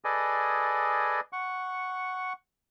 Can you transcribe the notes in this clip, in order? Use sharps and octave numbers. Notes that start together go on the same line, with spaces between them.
G#4 A4 B4 D5 D#5 G#5
F#5 C#6